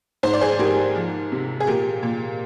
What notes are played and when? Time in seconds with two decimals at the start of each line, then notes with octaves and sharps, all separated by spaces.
0.23 G#2 C5
0.33 D5
0.41 G#4 C5
0.59 G#2 G4 A#4
0.95 F3
1.32 C3
1.60 G#4
1.67 A#2 G4 A#4
2.03 A#2